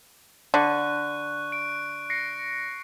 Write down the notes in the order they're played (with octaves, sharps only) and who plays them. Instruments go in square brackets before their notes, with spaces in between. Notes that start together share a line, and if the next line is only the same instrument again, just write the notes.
[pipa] D3 [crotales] C#6 F#6
[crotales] D7
A#6 C7 C#7